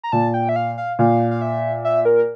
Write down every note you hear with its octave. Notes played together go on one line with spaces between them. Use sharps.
A#5
A#2 A5
G5
E5
F5
F5
A#2 F5
F5
E5
E5
A#4